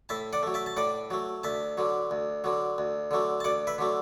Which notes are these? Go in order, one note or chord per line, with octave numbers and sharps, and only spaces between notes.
A2 E5 A5
D5 F#5
F#3 A3
E5 A5
A5
A2 D5 F#5
F#3 A3
D2 E5 A5
D3 F#3
D2
D3 F#3
D2
D3 F#3 A3
A5
D2 D5 F#5
B4 E5
D3 F#3 A3